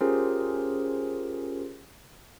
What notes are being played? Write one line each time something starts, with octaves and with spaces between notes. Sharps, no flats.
C#4 F4 G4 G#4 A#4 C5